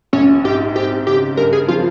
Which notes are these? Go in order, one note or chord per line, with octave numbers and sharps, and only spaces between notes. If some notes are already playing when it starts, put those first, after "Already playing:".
A#1 C#4
G#2 G4
C4 G4
C#3 G4
G2 A#4
G#4
F3 F4